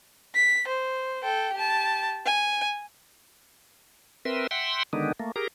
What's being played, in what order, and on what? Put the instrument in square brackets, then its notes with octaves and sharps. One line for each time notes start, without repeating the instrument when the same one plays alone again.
[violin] B6
C5
A4 G5
G4 A5
G#5
[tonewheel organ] C4 A#4 B4 E5 C6
E5 F#5 G5 C6
D3 D#3 G#3 B3 D4 D#4
A3 A#3
G4 G#4 A#4 A#5